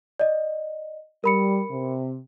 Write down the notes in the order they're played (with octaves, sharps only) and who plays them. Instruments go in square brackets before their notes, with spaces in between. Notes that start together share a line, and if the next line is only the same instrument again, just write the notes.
[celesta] D5 D#5
[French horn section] G3 [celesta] A#4 B5 C#7
[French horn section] C3